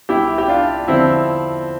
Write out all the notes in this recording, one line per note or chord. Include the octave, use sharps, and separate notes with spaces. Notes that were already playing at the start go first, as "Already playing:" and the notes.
C2 B2 E4 G4
G4
D4 F4
E2 D3 F3 C4 E4